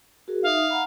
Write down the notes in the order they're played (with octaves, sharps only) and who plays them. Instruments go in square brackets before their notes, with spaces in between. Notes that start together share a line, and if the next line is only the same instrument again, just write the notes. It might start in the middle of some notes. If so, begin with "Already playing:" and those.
[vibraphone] F#4 G#4 A#4
[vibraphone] D#4 E5 D#6 [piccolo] F5
[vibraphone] F#5 A#5 B5